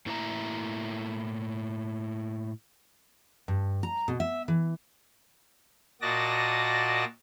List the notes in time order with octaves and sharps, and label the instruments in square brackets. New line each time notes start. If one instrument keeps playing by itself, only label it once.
[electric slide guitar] A2 A#3 E4 A#4 E5 A#5
[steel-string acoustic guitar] G2
A#5
B2
E5
E3
[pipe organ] A#2 F#4 D5 D#5 A5 A#6